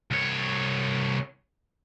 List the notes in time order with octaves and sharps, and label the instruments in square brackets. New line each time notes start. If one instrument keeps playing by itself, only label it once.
[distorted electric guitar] C2 C#5